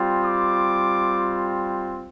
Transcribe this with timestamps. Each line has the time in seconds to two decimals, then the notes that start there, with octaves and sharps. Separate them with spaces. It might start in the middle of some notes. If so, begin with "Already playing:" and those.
Already playing: G3 C4 F4
0.25 D6